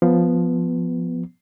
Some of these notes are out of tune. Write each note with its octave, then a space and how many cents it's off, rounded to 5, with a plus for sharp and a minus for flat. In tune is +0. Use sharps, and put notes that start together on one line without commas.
F3 +0 B3 +0